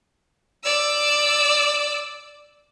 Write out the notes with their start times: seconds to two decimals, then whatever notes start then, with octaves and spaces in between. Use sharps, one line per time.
0.64 D5 E6